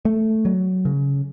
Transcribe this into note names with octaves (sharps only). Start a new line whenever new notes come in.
A3
F#3
C#3